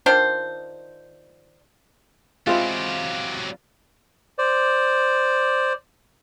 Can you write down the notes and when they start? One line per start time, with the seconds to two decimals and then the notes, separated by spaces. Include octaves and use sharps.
0.06 D#3 D4 F4 C5
2.47 F#3 G#3 C4 E4 F4 G4
4.38 C5 D5